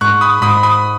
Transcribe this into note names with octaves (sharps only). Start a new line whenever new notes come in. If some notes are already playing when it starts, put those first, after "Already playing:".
G#2 C#6 F#6
B5 D#6
G#2 B5 D#6
B5 D#6